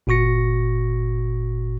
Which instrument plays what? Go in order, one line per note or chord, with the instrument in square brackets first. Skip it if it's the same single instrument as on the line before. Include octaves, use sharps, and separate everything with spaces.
[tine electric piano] G1 A#2 F#4 C#6 A#6 C#7